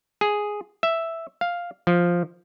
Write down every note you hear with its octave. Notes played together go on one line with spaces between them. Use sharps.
G#4
E5
F5
F3